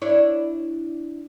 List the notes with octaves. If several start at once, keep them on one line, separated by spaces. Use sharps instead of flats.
D4 E4 C#5